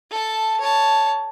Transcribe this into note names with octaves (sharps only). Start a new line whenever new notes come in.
A4 A5
C#5 A5